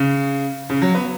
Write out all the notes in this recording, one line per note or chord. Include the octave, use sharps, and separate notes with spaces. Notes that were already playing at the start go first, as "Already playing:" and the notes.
Already playing: C#3
C#3
F#3
B3